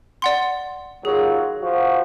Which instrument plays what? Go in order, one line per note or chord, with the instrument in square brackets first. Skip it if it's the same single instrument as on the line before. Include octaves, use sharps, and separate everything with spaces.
[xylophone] D5 F#5 C6
[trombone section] D#2 F#3 F4 [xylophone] G#4
[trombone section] F3 F#4